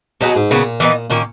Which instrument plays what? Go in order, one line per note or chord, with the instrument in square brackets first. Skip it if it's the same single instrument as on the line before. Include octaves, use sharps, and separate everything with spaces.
[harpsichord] B2 [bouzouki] F#3 B3 D#4 G#4
[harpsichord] G#2
[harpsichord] A#2 [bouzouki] C#3 F#3 B3
[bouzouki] E3 B3 D#4
[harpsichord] A#2 [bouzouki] D#3 A#3 C#4